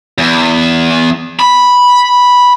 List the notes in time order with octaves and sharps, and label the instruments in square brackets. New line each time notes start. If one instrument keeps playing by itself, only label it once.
[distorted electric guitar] E2
B5